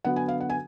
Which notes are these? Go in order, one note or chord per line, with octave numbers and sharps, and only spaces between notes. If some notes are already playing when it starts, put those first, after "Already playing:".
D3 F#3 B3 D4 F#5
G#5
F5
F#5
G#5